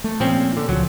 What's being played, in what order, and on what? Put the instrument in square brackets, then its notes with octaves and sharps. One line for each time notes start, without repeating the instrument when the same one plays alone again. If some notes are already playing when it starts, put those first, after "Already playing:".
[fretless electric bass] A3
[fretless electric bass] A#2 [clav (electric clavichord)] F3 C4 C#4
[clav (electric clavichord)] D3
[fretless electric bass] C#2 F3 [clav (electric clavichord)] F#3